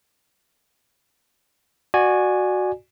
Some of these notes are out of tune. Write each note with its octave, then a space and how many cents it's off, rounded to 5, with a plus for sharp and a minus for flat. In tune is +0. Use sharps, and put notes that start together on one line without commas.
F#4 -5 D5 +25 G#5 +0